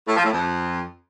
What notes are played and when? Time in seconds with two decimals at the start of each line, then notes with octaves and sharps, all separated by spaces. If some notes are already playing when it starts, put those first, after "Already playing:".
0.08 A2
0.16 F3
0.24 A2
0.32 F2